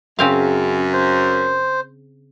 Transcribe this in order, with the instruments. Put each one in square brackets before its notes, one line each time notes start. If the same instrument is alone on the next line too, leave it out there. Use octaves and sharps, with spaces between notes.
[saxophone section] F#2 [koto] C#3 C4 F5
[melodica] C5